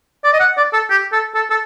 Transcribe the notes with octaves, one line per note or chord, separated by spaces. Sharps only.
D5
D#5
F#5
D5
A4
G4
A4
A4
A4